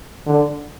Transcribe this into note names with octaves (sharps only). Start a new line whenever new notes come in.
D3